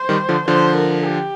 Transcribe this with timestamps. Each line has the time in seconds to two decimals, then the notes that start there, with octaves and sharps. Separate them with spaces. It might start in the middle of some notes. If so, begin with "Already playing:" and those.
Already playing: C5
0.09 D#3 G3
0.29 D3 F3
0.48 D3 F3 C5
0.76 A#4
1.05 G4